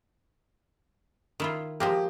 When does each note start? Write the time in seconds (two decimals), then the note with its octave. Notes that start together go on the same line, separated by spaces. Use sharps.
1.40 D#3 E4 F4
1.80 F3 G#3 A#3 G4